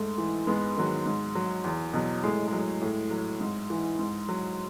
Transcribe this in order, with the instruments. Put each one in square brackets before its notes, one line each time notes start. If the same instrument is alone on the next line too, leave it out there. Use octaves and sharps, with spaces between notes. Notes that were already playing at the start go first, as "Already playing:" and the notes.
Already playing: [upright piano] G#2 A3
E3
G#2 G#3 B3
D#3 F#3
G#2
F#3
E2
B2 F#3
A2 G#3
F#3 G#3
A2
F#3
G#2
E3
G#2
F#3